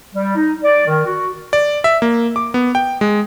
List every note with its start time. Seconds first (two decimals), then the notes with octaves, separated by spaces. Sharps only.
0.15 G3
0.36 D#4
0.64 D5
0.86 D#3
1.06 F#4
1.53 D5
1.84 E5
2.02 A#3
2.36 D6
2.54 B3
2.75 G5
3.01 G#3